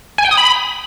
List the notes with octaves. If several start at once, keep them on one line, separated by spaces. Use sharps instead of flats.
G#5
G5
D#6
B5